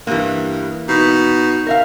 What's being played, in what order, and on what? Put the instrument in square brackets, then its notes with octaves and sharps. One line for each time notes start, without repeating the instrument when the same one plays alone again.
[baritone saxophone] G2 [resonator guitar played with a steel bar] E3 A#3
[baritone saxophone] B2 [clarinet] D#4
[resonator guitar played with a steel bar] A#4 E5 F5